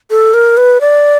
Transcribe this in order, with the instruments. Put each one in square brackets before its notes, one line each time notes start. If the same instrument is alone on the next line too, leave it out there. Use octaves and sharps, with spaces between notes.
[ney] A4
A#4
B4
D5